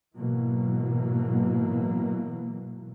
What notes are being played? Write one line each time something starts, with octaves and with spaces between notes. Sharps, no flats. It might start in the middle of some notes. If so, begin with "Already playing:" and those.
G#2 B2 E3 F#3 A#3